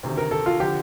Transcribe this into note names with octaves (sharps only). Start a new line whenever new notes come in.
D2 C3 D#3
A#4
A4
F4
D3 F3 G4